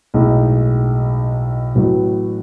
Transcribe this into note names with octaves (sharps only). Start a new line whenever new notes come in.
B1 A2 G#3 D#4
A1 A2 F#3 B3 F#4